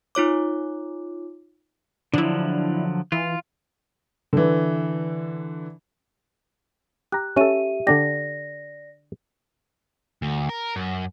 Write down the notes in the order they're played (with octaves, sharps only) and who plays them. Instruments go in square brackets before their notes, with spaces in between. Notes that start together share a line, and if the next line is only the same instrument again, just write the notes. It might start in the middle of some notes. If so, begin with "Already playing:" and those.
[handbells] D#4 F4 C#5 D6
[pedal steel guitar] D3 F3 F#3 [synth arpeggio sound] D4 E4
[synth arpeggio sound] E3 [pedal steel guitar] F4
[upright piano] D3 E3
[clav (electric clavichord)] G4 A#5 [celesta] F#6
[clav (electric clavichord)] C#4 A4 [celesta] G4 E5 D#7
[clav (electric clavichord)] D3 D4 G4 [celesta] D5 A#6
[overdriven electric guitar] D2
A#4
F#2